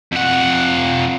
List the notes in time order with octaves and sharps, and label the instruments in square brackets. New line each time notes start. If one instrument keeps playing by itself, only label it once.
[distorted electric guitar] F2 F#5